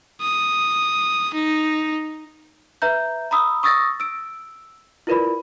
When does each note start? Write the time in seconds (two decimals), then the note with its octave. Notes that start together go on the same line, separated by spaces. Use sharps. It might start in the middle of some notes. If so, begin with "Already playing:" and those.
0.22 D#6
1.34 D#4
2.82 B4 E5 A#5 G6
3.31 A#5 B5 D#6 E6
3.63 C#6 D#6 E6 A6 A#6
4.00 E6 D7
5.07 E4 F4 A#4 B4 D5 B5